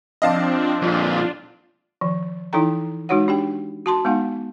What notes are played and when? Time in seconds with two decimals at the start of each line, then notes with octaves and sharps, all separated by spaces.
0.22 F3 C4 D4 D#5 F5 A5
0.82 F2 A#2 D4 F4
2.01 D#3 F3
2.53 E3 D#4 E4 A4 G5 A#5
3.09 G#3 D#4 F#4 C#5 F#5
3.28 D4 G4 G5
3.86 F#4 A5 C6
4.05 G#3 B3 D#4 F5 F#5